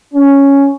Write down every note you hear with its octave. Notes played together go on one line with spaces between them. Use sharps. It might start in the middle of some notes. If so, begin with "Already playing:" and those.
C#4